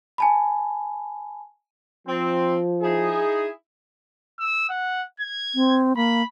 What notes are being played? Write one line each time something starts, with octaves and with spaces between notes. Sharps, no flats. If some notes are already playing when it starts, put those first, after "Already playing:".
G#5 A5 B5
F3 C4
D#4 E4 G#4
E6
F#5
G#6
C4
A#3 B5